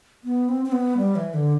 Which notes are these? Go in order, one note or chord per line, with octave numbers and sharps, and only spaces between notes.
B3
C4
C4
B3
G3
E3
D3